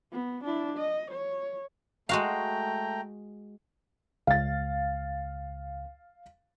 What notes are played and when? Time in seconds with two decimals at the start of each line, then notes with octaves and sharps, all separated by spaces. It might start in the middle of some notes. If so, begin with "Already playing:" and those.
0.12 B3
0.44 D4 E4
0.78 D#5
1.11 C#5
2.09 G#3 A3 F#4 F5 G5 A#5
4.27 C#2 F5 A6